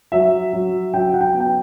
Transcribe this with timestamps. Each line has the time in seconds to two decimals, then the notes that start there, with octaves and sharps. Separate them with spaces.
0.12 F#3 E5
0.53 F#3
0.94 F#3 G5
1.13 F#5
1.21 G5
1.35 B3
1.40 G5